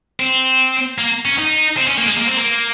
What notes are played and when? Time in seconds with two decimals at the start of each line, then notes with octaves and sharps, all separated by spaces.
0.20 C4
0.98 A#3
1.25 C#4
1.38 D#4
1.77 C4
1.87 C#4
1.98 A#3
2.08 G#3
2.17 A#3
2.27 C4
2.37 A#3